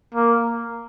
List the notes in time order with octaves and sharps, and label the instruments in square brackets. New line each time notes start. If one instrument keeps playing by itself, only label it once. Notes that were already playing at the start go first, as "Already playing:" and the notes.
[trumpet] A#3